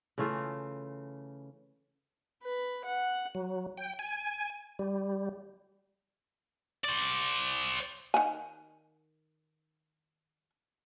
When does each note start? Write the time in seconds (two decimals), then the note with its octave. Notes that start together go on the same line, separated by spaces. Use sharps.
0.18 C#3 E3 A3 F4
2.43 B4
2.85 F#5
3.35 F#3
3.77 G5
3.99 G#5
4.79 G3
6.84 C5 D5
8.14 D#3 F#5 G#5